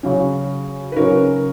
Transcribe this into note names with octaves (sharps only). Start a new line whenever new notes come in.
C#3 F#3 C#4
B4
C#3 F#3 C#4 A#4 C#5